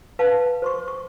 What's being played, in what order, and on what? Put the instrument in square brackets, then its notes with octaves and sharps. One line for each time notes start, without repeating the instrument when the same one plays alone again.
[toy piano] B4 F5 A5
C5 C6 C#6
C#6